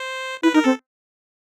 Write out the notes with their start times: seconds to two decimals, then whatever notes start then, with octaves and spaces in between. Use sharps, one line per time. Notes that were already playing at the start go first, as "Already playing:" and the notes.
Already playing: C5
0.43 E4 B4
0.54 D#4 A#4
0.64 C4 A4